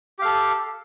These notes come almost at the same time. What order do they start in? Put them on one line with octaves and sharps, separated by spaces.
G4 F5 A4